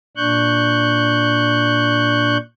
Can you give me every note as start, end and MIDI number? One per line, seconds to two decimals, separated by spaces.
0.17 2.37 46
0.17 2.37 62
0.17 2.37 85
0.17 2.37 90
0.17 2.37 91